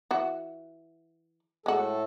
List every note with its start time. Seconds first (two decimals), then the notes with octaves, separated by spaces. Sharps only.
0.11 E3 F#4
1.66 A2 G#3 A3 F#4 A4